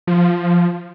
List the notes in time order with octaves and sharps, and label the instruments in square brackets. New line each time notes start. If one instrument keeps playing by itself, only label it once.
[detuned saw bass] F3